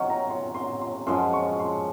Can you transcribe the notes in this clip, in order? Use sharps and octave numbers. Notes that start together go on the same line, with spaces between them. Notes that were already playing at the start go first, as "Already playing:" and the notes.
Already playing: C3 D#3 F#3 C#4 C6 C#6
A#5
C6
C6
C6
F#2 F3 G#3 C#4 C6
C#6
C6